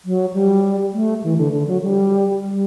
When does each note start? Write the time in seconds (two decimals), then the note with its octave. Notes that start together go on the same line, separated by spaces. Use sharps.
0.05 F#3
0.34 G3
0.93 A3
1.24 E3
1.38 D3
1.53 D3
1.68 F#3
1.83 G3
2.42 G3